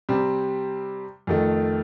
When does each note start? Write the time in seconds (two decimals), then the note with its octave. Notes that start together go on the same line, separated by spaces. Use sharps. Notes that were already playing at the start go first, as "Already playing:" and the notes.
0.09 C3 G3 C4
1.27 F2 D#3 A3